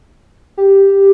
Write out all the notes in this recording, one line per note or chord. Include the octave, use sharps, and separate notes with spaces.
G4